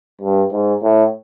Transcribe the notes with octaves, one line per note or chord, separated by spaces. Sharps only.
G2
G#2
A2